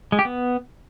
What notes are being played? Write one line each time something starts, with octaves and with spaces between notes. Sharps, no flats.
G#3
G4
B3